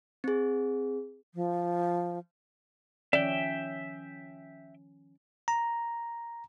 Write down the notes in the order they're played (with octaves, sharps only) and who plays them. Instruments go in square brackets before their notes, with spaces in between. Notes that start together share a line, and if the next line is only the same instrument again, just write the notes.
[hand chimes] C4 G#4
[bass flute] F3
[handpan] D#3 F3 C#4 [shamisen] D5 [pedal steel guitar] E5 G5
[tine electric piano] A#5